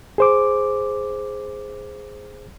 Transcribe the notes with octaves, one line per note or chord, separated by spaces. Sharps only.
G#4 C5 D6